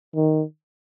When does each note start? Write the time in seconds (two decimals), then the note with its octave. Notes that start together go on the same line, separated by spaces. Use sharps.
0.16 D#3